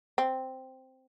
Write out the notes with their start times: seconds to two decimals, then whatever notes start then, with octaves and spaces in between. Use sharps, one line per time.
0.18 C4